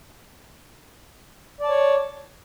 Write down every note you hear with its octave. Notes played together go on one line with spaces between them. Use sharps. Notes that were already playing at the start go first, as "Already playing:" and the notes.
C#5 D5 A5